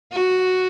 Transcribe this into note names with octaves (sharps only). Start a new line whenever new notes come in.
F#4